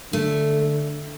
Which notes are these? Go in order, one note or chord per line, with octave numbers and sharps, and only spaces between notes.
D3 A3